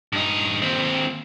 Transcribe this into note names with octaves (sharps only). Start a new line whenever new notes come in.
G2 D#4
D#2 C4